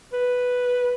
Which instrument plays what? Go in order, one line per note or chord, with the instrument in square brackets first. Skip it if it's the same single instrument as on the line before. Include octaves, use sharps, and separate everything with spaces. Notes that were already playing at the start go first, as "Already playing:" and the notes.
[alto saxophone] B4